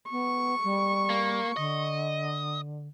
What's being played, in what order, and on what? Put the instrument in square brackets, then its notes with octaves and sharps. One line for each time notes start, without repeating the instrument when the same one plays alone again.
[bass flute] B3 [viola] C#6
[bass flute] G3
[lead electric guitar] A#3
[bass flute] D3 [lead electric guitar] D#5